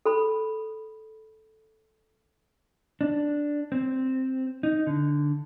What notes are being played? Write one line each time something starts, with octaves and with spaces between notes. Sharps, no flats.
A4 B5
D4
C4
D#4
D3